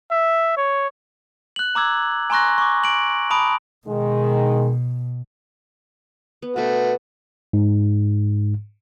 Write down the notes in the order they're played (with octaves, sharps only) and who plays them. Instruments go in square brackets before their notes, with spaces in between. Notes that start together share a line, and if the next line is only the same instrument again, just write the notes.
[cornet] E5
C#5
[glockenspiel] F#6 F#7
A#5 D6 E6 G#6
G#5 A#5 C6 C#6 F#6 A#6
C#6 D6
D7 F#7
A5 B5 D#6 D7
[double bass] B2 [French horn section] D#3 G#3
[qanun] B3
[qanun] B2 B3 [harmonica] A3 F#4
[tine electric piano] G#2